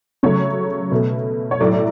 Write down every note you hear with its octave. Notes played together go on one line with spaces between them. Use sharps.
C#3 F#3 A3 C#5
B2 A3
C#5
A2 F#3 A3 D5